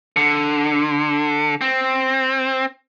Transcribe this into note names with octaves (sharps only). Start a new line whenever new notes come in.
D3
C4